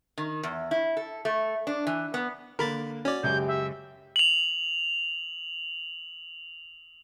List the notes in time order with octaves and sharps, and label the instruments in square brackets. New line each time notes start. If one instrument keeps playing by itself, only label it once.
[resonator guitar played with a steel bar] D#3
E2
E4
A4
A3
D4
E3
B3
[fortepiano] D3 A#3 [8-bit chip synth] A#4 B5 A6
[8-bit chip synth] C#4 D5 [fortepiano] F#4
[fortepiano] C#2 F#2 [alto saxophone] G4 [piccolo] G6
[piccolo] E5
[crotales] F7 F#7